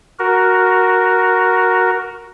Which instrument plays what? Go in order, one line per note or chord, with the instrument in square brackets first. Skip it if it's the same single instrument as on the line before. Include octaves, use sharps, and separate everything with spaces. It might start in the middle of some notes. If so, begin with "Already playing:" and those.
[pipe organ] F#4 A#4